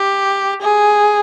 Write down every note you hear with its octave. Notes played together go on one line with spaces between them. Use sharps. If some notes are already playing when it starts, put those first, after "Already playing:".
Already playing: G4
G#4